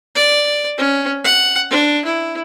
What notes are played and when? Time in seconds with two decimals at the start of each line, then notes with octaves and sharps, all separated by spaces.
0.15 D5
0.78 C#4
1.24 F#5
1.71 D4
2.05 E4